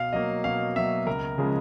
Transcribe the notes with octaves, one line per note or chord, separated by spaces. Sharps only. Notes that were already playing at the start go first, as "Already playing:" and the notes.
Already playing: B2 F5
F#3 A#3 D#5
B2 F5
F#3 A#3 E5
C#2 A#4
C#3 F3 G#3